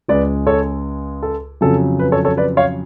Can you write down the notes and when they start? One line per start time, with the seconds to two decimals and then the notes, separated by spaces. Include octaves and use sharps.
0.08 C#2 C#3 G#3 B4 D5
0.47 A4 C#5
1.23 A4
1.61 F2 C#3 F#3 A4
1.99 B4
2.12 A4 C#5
2.25 A4 C#5
2.37 B4 D5
2.57 C#5 F5